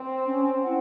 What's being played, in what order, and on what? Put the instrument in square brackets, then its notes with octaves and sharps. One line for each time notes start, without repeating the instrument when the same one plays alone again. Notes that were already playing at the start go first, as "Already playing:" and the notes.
Already playing: [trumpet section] C4
[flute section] C#4
E4 C5 F#5